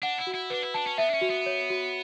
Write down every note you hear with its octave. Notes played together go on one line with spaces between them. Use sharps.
D4 F#5
E4
F#4
E4
D4 B4
E4
D4 A5
C#4
B3 E5
D4
C#4
F#4
B3
C#5
F#4